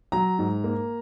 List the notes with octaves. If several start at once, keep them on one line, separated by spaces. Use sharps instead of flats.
F#3 A#5
G#2
A#3